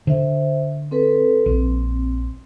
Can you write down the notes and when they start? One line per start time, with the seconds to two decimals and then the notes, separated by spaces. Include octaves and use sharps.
0.07 D3 C5 E5
0.91 C4 A4 B4
1.46 A#1 C4